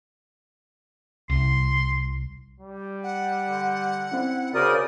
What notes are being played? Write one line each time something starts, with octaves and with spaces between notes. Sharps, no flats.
C2 C6
G3
F#5
D3
C4 C#4 E4
C#3 F#4 A#4 C5 D5 D#6